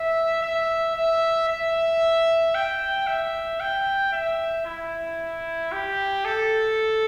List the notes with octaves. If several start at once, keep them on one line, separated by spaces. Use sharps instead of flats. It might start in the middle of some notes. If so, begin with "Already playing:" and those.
Already playing: E5
E5
E5
E5
G5
E5
G5
E5
E4
G4
A4